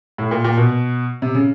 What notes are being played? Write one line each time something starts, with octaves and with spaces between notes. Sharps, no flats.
A2
A#2
A#2
B2
C3
C#3